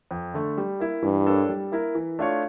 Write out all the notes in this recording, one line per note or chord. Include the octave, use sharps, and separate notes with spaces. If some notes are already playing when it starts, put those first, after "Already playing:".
F2
D3 A3
G3
A#3 E4
G2 E3
A#3 D4 A4 C#5
G3
A#3 E4 A#4
E3
A3 D4 F4 C#5